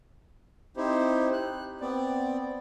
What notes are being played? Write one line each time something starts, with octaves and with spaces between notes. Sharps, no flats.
C4 D#4 E4 G4 C5
F#6
B3 C4 D5